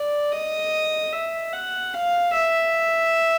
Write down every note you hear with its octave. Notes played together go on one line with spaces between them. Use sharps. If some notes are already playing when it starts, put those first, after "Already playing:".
Already playing: D5
D#5
E5
F#5
F5
E5